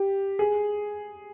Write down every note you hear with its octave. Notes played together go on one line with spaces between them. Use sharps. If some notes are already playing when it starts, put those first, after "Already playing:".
Already playing: G4
G#4